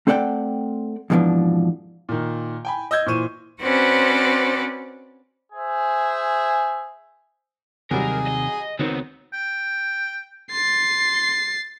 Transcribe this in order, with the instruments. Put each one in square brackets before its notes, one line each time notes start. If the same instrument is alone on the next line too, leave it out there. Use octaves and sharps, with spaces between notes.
[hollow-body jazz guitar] A3 C4 A4 D5 F#5 G5
F2 G#2 B2 E3 F3 D4
[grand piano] A#2 D#3
G5 G#5 B5
D#5 E6 G6 G#6
A#2 E3 C5 C#6 D#7 E7
[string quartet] C4 C#4 F#4 B4 C5 D5
[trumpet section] G#4 C5 E5 G#5
[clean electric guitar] D#2 C3 D#4 [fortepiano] F#3 G3 [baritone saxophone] G#4 [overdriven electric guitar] A#4
[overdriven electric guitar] D#5
[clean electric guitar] C#2 F#4 C#5 [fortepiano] D#3 [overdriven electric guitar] B3 C4
[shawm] G5
[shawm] C6 [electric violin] A6 C7